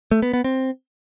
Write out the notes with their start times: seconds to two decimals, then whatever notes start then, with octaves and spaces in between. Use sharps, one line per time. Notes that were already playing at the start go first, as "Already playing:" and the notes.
0.11 A3
0.22 B3
0.33 B3
0.44 C4